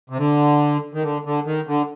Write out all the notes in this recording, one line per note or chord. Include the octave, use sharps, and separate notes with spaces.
C3
D3
D#3
D3
D3
D#3
D3